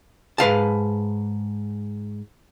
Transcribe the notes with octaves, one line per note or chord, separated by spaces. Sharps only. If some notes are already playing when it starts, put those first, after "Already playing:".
G#2 B4 F5 A5